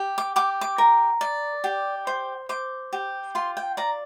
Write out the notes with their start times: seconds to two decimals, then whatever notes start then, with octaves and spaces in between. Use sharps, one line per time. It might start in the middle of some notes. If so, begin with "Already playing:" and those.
Already playing: G4
0.18 D6
0.36 G4 D6
0.61 D6
0.78 A#4
1.21 D5
1.64 G4
2.07 C5
2.49 C5 D6
2.93 G4
3.35 F4 C6
3.57 G5
3.77 D5 A#5